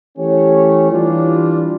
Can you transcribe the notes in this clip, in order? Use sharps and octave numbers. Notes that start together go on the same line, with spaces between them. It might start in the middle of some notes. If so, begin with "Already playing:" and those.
E3 A3 C#4 G4 C#5
E3 G3 D4 F4